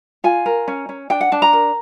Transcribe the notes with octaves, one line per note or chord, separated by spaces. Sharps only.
F4 G#5
A#4
C#4
C#4
D4 G5
F#5
D4 A5
A#5
A#4